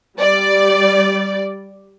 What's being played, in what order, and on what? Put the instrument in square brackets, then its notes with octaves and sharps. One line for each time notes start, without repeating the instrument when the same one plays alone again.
[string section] G3 D5